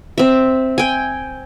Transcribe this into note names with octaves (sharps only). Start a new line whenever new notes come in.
C4 E5
G5 G#5